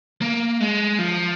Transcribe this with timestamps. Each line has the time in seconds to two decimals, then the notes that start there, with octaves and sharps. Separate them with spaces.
0.22 A#3
0.61 G#3
0.99 F3